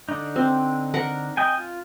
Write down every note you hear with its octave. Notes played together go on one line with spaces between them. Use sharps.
D3 D4 D#4
C4
A#4 F#5
D#5 G5 G#5
F4